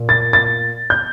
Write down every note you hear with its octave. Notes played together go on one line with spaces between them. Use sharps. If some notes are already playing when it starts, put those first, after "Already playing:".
Already playing: A#2
A6
A6
G6